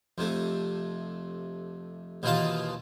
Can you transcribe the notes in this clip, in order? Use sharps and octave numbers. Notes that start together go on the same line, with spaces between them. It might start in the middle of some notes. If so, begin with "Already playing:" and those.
F2 C3 A3
D#2 B2 E3 D#4 F4 A5